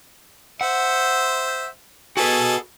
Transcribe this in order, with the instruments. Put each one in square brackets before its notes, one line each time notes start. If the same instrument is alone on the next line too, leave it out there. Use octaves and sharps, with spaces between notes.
[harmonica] C5 E5 [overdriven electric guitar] F#5
[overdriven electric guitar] F#4 B4 [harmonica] G#4 A4